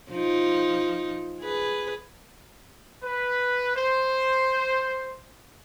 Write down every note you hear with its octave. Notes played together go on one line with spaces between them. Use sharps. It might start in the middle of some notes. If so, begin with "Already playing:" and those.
F3 D#4
G#4 B4
B4
C5